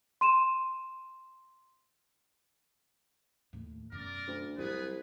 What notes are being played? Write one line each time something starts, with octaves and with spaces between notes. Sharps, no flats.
C6 D#7 E7
D#2 A2
F#2 B2 A#4 D5
D2
C2 F3 F#3 B3 G#4 B4